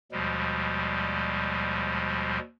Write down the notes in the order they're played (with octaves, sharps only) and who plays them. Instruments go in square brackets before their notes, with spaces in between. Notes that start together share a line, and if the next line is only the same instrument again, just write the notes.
[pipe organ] D#2 B2 F3 G3 G#3